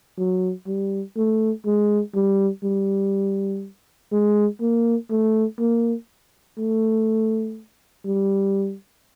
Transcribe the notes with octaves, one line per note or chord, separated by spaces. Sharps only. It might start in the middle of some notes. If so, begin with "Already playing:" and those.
F#3
G3
A3
G#3
G3
G3
G#3
A#3
A3
A#3
A3
G3